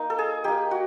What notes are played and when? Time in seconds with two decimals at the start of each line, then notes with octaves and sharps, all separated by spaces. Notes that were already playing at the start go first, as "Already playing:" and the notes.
Already playing: A#3 D#4
0.10 A4
0.19 G#4
0.44 A#3 D#4 G4
0.71 F#4